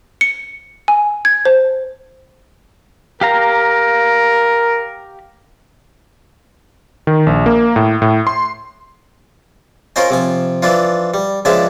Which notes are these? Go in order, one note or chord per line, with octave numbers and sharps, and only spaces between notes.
C#7
G#5
G#6
C5
G4 A#4 F5 A#5
D#3
A#1
A#3
A2
A2
C6
C#4 F4 A#4 C5 D#5 G#5
C3 F3 G#5
E3 F3 D4 F4
G3
C#2 F3 G#3 D4 E5 A5